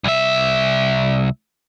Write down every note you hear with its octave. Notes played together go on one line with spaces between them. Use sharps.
C2 E5